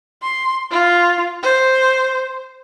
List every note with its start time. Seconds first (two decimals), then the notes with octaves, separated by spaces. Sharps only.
0.23 C6
0.71 F4
1.43 C5